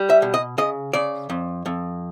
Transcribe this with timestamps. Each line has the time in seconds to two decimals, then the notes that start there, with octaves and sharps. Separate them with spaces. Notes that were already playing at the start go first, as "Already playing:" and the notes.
Already playing: G3
0.10 E5
0.22 B2
0.34 D#5
0.58 C#3 D#5
0.93 C#3 D5
1.30 F2
1.66 F2